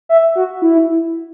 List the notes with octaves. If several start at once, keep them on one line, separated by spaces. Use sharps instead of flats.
E5
F#4
E4